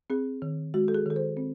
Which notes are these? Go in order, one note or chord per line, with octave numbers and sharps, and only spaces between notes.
C4 G#4
D#3
G#3 F#4
A4
G#4
D#3 A4
C5
C4